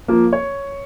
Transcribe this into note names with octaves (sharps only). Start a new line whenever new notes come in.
F3 A#3
C#5